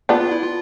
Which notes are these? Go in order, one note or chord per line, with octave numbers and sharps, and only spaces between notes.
B3 D4 F4
F4
E4
F4